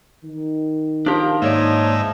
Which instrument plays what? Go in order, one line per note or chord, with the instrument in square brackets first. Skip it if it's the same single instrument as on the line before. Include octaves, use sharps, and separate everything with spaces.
[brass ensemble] D#3
[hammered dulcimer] F3 [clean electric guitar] D4 G4 A#4
[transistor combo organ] G#2 D#4 E5 [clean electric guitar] A#3 C#5 D5